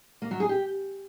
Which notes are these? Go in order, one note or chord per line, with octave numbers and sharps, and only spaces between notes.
A#3
F#3
G#4
G4